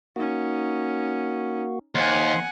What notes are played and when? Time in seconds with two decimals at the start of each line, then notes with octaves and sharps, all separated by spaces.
0.16 A#3 C#4 D#4 F#4
1.95 D#2 C5 F#5 G#5 C6